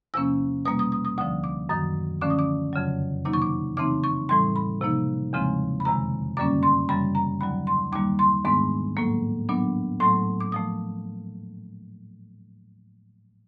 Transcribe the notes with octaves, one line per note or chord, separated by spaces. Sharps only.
E2 C3 F3 A#3 C#4 E6
B2 G3 A#3 D#6
D#6
D#6
D#6
D2 D3 F3 D#6
D6
F#2 D#3 F#3 D#6
D3 F3 A3 C#4 D6
D#6
D6
F2 C#3 F#3
C3 D#3 F#3 A#3 D#4 D6
C#6
D6
C#3 E3 A3 C4 D#4 D6
C#6
A2 E3 G3 C6
B5
C3 F3 A#3 D#4
E2 C#3 F3 G#3 C4
B5
F2 C3 D#3 G#3 A#5
F#2 D3 G3 A#3 C#4 D6
C6
F#2 C#3 E3 G3 B5
A#5
D#2 D3 F#3 B5
C6
D#2 D#3 G3 A#3 D6
C6
G#2 D#3 G#3 B3 D4 C6
A2 F#3 A#3
A#2 F#3 B3 D4
A2 F#3 A3 C6
D6
A#2 F3 A3 D#6